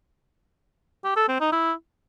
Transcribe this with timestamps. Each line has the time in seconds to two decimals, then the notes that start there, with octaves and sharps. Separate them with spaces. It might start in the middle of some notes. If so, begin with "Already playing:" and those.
1.04 G4
1.16 A4
1.28 C4
1.40 D#4
1.52 E4